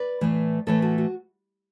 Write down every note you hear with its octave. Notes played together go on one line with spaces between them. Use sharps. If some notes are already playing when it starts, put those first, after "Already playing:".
Already playing: B4 D5
A2 E3 A3
A2 E3 A3 A4 C#5
F#4 A4
F#4